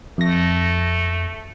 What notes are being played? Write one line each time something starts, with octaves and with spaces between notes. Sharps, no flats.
F2 A3 A#6